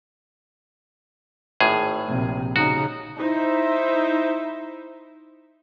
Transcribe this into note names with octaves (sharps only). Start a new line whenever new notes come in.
G#1 A2 G#4
A#1 C3
C#3 D#4 F#4
D#4 E4 C5 E5